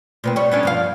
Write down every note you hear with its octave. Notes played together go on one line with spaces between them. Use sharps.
A#2 B3 C4
G3 C#5
B3 C#4 D4
G2 F3 F5